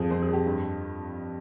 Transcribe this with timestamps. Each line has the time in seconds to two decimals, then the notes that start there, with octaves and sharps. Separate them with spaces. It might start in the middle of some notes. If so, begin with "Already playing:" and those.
Already playing: F2 F3 G#4
0.10 F2 C5
0.22 G#4
0.28 F2
0.33 G4
0.46 G2